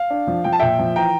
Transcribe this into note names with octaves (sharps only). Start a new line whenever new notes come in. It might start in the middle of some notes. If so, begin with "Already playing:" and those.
Already playing: F5
D4
F3
F3 G5
A5
A#2 E5 G5
F3
E3 G5 A#5